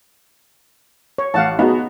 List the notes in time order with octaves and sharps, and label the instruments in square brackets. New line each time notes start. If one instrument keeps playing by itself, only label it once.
[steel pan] C#5
[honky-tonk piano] A1 [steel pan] F5 F#5 A5
[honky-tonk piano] B3 F#4 G#4 [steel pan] D#4